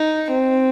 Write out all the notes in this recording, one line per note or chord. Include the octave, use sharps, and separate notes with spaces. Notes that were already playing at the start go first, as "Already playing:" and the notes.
Already playing: D#4
C4